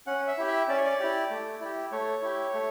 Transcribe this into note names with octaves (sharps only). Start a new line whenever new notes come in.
C#4 F#5
E5
E4 G4
E5
C#4 D5
C#5
D5
E4 G4
A3
E4 G4
A3 C#5
E4 G4
A3